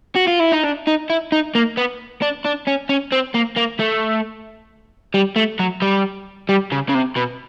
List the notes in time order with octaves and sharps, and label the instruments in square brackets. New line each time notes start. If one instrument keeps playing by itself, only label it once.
[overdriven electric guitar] F#4
F4
E4
D#4
D4
D#4
E4
D#4
A#3
B3
D4
D4
C#4
C#4
C4
A#3
A#3
A3
G3
A3
F#3
G3
G3
C#3
C#3
C3
B2